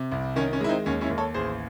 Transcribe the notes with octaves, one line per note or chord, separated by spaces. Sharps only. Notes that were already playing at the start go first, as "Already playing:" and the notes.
Already playing: C3
C2
D#3 C#4
C#4
G#3 E4
C4 D#4
D#2 C#4
C#4 E4
D#2
A4 C#5
A1 G#4 C5